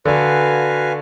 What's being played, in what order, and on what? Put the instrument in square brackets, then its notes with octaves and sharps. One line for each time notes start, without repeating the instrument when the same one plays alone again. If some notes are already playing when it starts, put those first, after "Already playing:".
[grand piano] D3 [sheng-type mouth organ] F#4 B4 F5 G#5